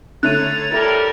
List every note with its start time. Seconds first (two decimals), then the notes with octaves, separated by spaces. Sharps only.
0.23 D3 A3 C#5 A#5 F#6 A6 D#7
0.72 G3 E4 A4 A#4